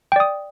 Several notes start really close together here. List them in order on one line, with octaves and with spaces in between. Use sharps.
G5 D5 D#6